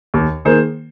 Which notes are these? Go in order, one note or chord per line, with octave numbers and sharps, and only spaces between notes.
D#2
D#3 A#3 G#4 C5